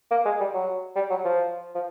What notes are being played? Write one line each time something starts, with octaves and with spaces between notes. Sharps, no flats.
A#3
G#3
G3
F#3
G3
F#3
F3
F3